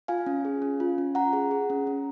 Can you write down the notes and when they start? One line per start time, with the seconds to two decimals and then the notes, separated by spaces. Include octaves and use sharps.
0.08 F4 F5 G#5
0.27 C#4
0.45 G#4
0.62 C#4
0.80 F4
0.98 C#4
1.15 C#4 F#5 A#5
1.33 G#4
1.51 G#4
1.70 C#4
1.87 C#4